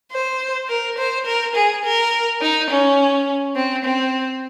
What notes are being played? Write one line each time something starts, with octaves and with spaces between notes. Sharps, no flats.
C5
A#4
C5
A#4
G#4
A#4
D#4
C#4
C4
C4